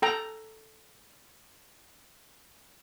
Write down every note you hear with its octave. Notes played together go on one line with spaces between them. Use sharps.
A4 G5 A#5